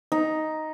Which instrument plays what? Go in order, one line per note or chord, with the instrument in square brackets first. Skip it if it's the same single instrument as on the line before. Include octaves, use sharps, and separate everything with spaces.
[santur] D#4